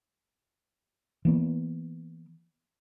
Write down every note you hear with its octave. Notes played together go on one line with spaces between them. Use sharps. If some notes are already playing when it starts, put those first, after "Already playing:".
E3 A#3 B3